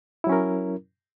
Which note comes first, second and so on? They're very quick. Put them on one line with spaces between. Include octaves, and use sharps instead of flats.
E4 F#3 C#4 A#4